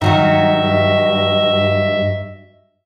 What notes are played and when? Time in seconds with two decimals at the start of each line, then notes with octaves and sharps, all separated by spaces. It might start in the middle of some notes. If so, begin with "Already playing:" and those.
0.02 G2 D#3 F#3 F#4 D#5 E5